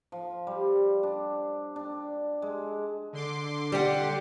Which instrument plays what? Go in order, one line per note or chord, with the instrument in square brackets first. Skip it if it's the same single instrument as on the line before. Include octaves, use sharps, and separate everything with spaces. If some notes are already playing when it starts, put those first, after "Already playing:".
[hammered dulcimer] F3
G3
D4
D4
G#3
[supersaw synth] D3 C6 D6
[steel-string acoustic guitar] G3 G4 F#5